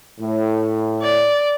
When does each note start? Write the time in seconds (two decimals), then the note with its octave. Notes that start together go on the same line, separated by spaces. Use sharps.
0.20 A2
1.02 D5